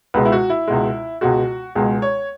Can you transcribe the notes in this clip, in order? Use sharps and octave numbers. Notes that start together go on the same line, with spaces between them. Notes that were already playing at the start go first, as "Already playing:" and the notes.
C#2 B2 G#3 B4
E4
F#4
E4
C#2 B2 G#3
C#2 B2 G#3 F#4
C#2 B2 G#3 G#4
C#5